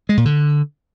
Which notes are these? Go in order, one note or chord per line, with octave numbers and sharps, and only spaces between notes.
G#3
A#2
D3